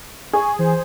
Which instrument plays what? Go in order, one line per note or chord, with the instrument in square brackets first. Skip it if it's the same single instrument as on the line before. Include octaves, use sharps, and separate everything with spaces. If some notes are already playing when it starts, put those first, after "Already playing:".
[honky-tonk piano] G#4 [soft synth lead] G#5 [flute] C#6
[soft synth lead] E3 [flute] C5